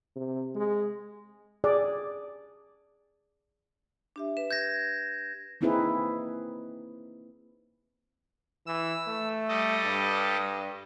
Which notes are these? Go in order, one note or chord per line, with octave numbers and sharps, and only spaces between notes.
C3
G#3
G#4 D5
D4 G4 E5
B4 E7
G6 G#6 A#6
A#3 C4 D#4 E4 G#4 B4
E3 E6
A3
G3 A4 D#5
G2